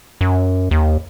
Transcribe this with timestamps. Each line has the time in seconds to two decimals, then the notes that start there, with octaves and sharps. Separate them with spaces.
0.21 F#2
0.71 D#2